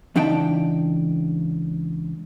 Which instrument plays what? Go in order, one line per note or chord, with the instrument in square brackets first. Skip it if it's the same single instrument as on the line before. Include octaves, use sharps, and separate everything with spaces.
[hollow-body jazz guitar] C#2 E3 D4 D#4 G5 A5